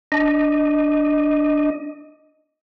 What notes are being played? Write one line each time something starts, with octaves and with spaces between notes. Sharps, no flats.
D4 D#5